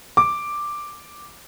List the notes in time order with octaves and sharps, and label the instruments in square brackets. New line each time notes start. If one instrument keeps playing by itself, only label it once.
[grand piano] D6